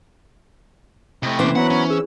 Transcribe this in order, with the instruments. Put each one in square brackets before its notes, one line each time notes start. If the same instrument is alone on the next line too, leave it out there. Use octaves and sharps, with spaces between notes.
[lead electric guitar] C3 A3 [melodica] E4 D#5 [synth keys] G5
[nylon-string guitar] E3 C5 [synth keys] A#3 C4 C#4 [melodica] D6
[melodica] F#3 B5 [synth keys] B3 [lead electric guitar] F#5
[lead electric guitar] C#4
[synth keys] E4 G#4 [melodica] E6